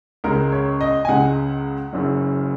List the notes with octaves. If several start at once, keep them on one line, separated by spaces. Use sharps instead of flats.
C#2 C#3 G#3 A#4
C#5
D#5
G#5
C#2 C#3 G#3 F#5
F#1 F#2 C#3